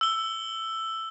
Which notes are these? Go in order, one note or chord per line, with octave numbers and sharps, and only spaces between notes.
E6 G7